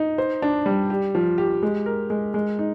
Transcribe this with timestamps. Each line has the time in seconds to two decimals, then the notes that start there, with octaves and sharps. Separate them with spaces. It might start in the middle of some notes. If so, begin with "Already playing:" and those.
Already playing: D#4
0.18 C5
0.42 D4
0.66 G3
0.90 G4
1.15 F3
1.38 G4
1.63 G#3
1.86 A#4
2.10 G#3
2.34 G#3
2.59 D#4